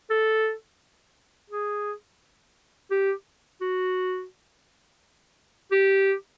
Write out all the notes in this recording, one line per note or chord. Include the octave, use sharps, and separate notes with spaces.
A4
G#4
G4
F#4
G4